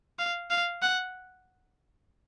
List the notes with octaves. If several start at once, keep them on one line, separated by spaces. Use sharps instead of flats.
F5
F5
F#5